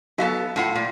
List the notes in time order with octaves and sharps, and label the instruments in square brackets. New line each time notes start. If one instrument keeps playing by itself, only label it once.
[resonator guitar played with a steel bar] F#3 B3 A4 [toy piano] D#4 F#4 F5
[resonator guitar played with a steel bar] A2 F4 F#5
A#2